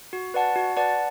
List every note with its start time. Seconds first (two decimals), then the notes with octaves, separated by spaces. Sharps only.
0.13 F#4
0.34 B4 D5 F#5 A5
0.56 F#4
0.76 B4 D5 F#5 A5